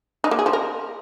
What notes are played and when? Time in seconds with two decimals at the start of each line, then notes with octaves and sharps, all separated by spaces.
0.24 D#4
0.31 A#3
0.39 G#4
0.46 F3
0.53 A#4